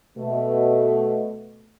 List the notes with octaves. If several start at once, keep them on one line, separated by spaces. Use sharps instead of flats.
B2 A3